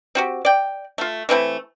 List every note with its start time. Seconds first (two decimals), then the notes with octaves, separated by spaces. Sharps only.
0.15 C4 F#4 G4
0.45 D5 G5
0.98 A3 F4
1.29 E3 A3 C4 E4